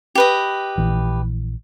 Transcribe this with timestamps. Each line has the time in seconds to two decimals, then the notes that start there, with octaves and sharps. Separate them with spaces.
0.15 G4 B4 D#5
0.78 A#1 E3